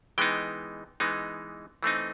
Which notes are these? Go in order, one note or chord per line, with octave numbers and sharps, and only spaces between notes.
E3 G#3 B3 D#4 G5
E3 G#3 B3 D#4
E3 A3 C4 D#4